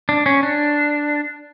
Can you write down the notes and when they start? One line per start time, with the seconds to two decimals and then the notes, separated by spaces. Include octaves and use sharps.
0.09 D4
0.26 C#4
0.43 D4